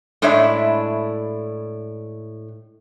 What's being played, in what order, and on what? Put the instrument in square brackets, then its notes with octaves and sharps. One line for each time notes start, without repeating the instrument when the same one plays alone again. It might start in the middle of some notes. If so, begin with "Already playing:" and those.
[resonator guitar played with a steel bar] A2 G#3 D4 E4 C#5 E5